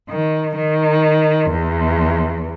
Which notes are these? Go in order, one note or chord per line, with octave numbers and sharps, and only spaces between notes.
D#3
D#3
E2